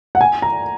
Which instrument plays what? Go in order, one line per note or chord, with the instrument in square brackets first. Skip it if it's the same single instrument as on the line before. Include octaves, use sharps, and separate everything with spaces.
[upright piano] F#5
G#5
A#5